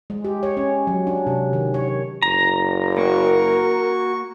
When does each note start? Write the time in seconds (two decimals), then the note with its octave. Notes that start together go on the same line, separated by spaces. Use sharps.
0.10 G#3
0.25 G4
0.43 C#5
0.57 C#4
0.87 F#3
1.07 D4
1.27 C3
1.53 D#3
1.74 C#5
2.22 F#1 A#5
2.97 A#3 F#4 A#4 C#6